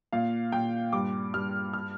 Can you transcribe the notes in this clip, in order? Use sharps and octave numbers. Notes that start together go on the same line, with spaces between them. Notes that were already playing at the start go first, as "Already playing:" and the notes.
A#2 F5
A#2 G5
G2 D6
G2 F6
F6